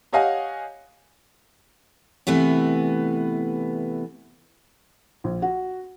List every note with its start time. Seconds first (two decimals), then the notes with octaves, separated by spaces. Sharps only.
0.13 G4 C#5 D#5 F5 F#5 G#5
2.27 C3 E3 A3 B3
5.24 A#1
5.42 F#4